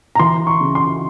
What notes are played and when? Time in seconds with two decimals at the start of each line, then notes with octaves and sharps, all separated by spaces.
0.15 A#5
0.19 E3 C6
0.47 C#6
0.61 C#3
0.75 C6